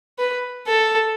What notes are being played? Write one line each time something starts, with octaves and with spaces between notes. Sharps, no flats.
B4
A4